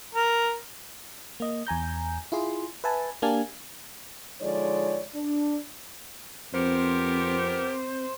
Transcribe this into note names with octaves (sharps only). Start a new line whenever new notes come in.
A#4
A#3 D#5
E2 G#5 A#5 G6
E4 F4 G#4 C6
B4 E5 G#5 A5
A#3 D4 G4 F5 G#5 A5
D3 F3 G#3 D#4 C#5 D5
D4
F2 B3 C4 G4 A#4 C5